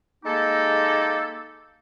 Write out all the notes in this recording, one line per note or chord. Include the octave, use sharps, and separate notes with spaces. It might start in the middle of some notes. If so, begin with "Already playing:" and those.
G#3 A#3 D#4 G4 A4